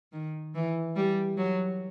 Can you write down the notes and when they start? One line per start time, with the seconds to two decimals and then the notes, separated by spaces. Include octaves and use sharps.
0.12 D#3
0.54 E3
0.96 G3
1.37 F#3